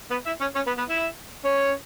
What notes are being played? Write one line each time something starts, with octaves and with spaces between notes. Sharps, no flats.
B3 B4
E4 E5
C#4 C#5
C#4 C#5
B3 B4
B3 B4
E4 E5
C#4 C#5